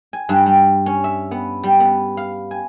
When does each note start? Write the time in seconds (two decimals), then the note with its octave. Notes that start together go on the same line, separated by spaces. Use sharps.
0.13 G#5
0.29 G2
0.46 G3
0.86 C#4
1.04 E5
1.31 B3
1.63 G3
1.80 B3
2.17 F5
2.51 G#5